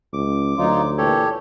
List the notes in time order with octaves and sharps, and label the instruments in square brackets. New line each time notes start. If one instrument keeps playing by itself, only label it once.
[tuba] C#2 [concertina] D6
[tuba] D2 [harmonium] F#3 D#4 F4
[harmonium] A#2 E3 [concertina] G4 A4 C#5